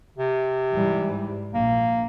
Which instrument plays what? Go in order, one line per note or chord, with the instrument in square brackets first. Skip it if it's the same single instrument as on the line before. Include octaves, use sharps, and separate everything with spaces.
[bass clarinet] C3
[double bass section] G#2 E3 G3
[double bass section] A#1 [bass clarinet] A#3